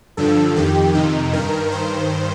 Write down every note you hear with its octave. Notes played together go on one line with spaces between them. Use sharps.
G2 D3 F3 A4
F2 D#3 G4
F2 C3 D#3 D#4
G2 D#3 A#4
G2 D#3 C5